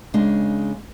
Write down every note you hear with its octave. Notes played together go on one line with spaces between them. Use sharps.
C#3 G#3 D4